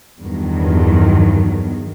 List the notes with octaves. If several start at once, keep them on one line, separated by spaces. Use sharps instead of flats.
E2 G2 D#3 F#3